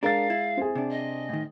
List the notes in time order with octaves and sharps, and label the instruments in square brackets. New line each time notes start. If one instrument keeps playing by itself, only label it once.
[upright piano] G#3 A6 [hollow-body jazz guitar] D4 A#4 [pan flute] F5
[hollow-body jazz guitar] E4
[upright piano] C4 G#4
[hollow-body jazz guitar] C3 D4
[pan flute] D#5
[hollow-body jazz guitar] A2 D#3